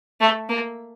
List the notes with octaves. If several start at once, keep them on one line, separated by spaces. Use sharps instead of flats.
A3
A#3